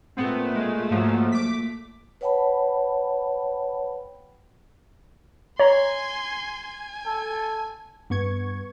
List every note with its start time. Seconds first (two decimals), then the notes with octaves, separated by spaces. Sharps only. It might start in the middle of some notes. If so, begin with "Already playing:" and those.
0.17 A#2 A3 B3 C4
0.55 G#3
0.91 G#2 F3 F#3
1.32 D6 B6
2.21 B4 C#5 F#5 G5 A5 B5
5.59 C#5 G#5 A#5 C6
6.66 G#5
7.06 A4
8.10 G2 B3 C#6 G#6